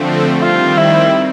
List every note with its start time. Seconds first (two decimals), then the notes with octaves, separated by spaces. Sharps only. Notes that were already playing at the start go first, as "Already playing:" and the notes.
Already playing: D3 F3 A3 C4
0.41 D#3 G3 C4 F4
0.78 E4